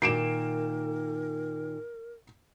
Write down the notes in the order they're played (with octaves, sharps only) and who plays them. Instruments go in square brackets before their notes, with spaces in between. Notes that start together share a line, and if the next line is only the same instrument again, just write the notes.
[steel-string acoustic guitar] A#2 D#3 [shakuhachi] A#4 [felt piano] C7 D7 E7